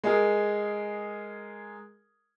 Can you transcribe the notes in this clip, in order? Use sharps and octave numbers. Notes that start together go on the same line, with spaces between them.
G#3 G#4 A#4